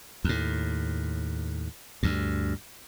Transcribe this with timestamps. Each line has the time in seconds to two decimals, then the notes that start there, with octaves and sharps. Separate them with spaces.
0.24 D#2 A2
2.03 D2 G2